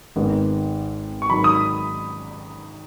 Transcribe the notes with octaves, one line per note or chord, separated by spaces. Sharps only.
G#1 G#2 D#3 B3
C#6
G#2 D#3 F#3 B5
D#6